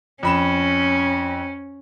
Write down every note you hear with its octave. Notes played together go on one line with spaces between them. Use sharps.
F2 C#4 B5 E7